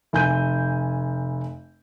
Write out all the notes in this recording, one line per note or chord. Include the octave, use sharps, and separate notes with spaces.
F1 G#5 G6 D#7